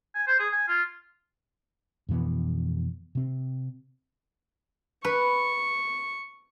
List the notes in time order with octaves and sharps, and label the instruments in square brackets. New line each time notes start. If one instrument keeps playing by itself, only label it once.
[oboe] G#5
C5
G#4
G#5
F4
[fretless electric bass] F2 B2 E3 B3
C3 C4
[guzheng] B4 [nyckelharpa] C#6